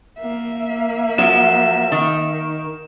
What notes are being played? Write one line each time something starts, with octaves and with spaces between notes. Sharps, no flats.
A#3 E5
F3 F#3 E7
D#3